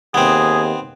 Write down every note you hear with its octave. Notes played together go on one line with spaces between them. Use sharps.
D#2 B3 C4 G#4